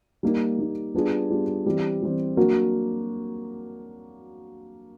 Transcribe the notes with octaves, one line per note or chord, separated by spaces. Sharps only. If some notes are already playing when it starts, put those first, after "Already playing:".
G3 A#3 D#4
G3 A#3 D#4
G3 B3 D4 F4 G#4
G3 B3 D4 F4 G#4
E3 G3 C4
E3 G3 C4
F#3 A#3 D4 F#4 A#4